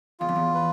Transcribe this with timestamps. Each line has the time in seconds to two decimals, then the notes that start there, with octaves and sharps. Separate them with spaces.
0.20 E2 F4
0.29 F2
0.36 E2
0.54 B4